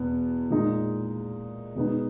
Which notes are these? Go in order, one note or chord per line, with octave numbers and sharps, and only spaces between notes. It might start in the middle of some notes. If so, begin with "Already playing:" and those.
Already playing: E2 B2 B3
A#2 G#3 D#4
B2 G#3 B3 D#4